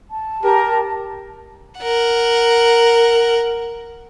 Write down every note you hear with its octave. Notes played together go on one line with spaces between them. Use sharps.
A5
G4 A#4
A#4 F#5